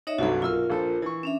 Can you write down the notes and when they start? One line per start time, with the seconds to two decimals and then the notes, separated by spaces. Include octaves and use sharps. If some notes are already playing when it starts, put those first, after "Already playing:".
0.07 D#4 C#5 D#5 E5
0.18 C2 G2 F#3 F#4 A4
0.42 B1 F4 A#4 E6 F6
0.70 A#1 A4 C5
1.02 E3 C#6
1.23 C#4 D4 E5